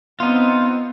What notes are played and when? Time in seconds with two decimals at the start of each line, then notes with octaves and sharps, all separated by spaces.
0.20 B3 C4 D#4 F4